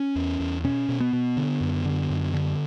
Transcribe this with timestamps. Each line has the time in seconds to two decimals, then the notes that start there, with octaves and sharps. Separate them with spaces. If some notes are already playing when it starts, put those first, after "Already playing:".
Already playing: C#4
0.16 E2
0.40 E2
0.64 B2 C#4
0.89 B2
1.00 B3
1.13 B2
1.37 D3
1.61 F#2
1.85 D3
2.10 F#2
2.34 D3